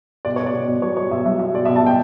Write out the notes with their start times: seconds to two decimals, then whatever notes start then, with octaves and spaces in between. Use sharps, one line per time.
0.25 B2 D5
0.36 C#5
0.39 B2
0.46 D5
0.53 B2
0.68 B2 D5
0.82 F#3 C#5
0.97 F#3 C#5
1.11 B2 E5
1.25 F#3 E5
1.39 F#3 E5
1.54 B2 D5
1.65 E5
1.68 B2
1.76 A5
1.83 B2 G5